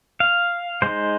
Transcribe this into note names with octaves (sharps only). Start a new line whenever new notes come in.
F5
G#3 D#4 C5